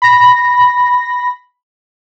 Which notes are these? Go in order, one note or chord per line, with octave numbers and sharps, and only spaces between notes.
B5 A#6